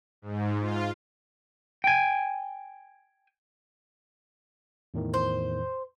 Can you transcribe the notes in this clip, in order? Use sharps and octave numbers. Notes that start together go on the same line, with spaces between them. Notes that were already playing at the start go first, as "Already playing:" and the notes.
G#2
F4
G5 G#5
E2 A2 D#3
C5